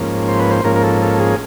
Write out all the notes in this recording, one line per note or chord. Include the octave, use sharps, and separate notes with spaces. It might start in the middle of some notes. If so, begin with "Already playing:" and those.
Already playing: G#2 F3 A#3 C#4
C5
B4
C5
G#2 F3 A#3 C#4 A#4
A#4
A4
A4
G#4